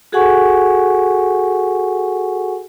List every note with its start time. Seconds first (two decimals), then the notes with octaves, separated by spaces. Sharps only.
0.12 F#4 G#4 A4 F#5 G#5 C#6